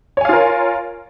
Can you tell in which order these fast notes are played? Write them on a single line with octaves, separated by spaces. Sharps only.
C#5 G#5 F5 F4 A#4